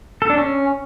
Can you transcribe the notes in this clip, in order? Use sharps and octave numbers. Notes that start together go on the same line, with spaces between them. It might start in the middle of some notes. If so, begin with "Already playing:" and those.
A4
D4
C#4